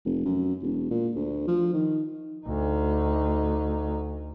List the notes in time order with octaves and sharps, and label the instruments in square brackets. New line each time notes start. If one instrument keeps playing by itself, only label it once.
[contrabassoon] F1
F#2
E1
A#2
D2
F3
D#3
[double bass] D2 D#4